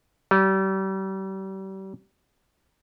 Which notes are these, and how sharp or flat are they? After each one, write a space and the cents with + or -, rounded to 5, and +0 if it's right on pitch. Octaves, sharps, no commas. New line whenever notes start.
G3 -35